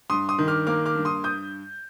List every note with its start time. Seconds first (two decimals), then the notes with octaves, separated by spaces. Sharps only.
0.10 G2 C6 D#6
0.29 C6 D#6
0.39 D#3
0.48 D6 F6
0.67 A#3 D6 F6
0.86 D6 F6
0.95 G2
1.05 C6 D#6
1.24 D#6 G6